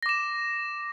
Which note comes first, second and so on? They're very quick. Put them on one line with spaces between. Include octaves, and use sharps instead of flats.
A#6 D6 E7